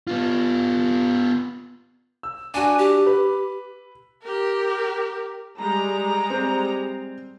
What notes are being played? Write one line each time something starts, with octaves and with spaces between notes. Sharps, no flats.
B3 F4
E6
D4 F#4 G#5
G4
B4
G4 A#4
G3 G#3 A#5
C4 C5